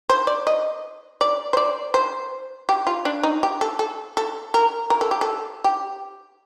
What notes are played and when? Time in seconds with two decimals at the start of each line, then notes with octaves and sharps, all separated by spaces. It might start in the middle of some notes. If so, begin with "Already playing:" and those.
0.09 C5
0.27 D5
0.47 D#5
1.21 D5
1.53 C5
1.57 D5
1.94 C5
2.69 G4
2.87 F4
3.05 D4
3.23 D#4
3.43 G4
3.61 A4
3.79 A4
4.17 A4
4.54 A#4
4.90 A#4
5.01 A4
5.11 G4
5.21 A4
5.64 G4